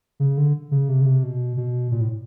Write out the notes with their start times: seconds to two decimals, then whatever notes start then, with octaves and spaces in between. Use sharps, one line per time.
0.20 C#3
0.37 D3
0.71 C#3
0.89 C3
1.01 C#3
1.05 C3
1.23 B2
1.57 B2
1.91 A#2
2.00 A2